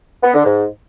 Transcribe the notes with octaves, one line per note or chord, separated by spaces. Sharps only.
B3
D3
G#2